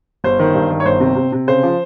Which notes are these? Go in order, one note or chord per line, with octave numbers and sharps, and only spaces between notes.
G1 C5
D#3
G2
D#3
C#5
G1 C5
C3
C3
C3
C#3 C5
F3